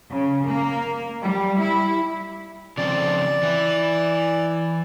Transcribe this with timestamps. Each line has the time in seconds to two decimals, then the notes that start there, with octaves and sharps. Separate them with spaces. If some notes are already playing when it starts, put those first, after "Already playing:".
0.11 C#3
0.46 A#3
1.21 G3
1.60 E4
2.78 C#3 F3 C4 D5
3.43 E3 E4